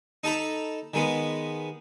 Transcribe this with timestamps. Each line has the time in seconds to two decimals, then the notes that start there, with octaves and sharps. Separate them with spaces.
0.24 D#4 A4 A#5 B5
0.94 D#3 G#3 B3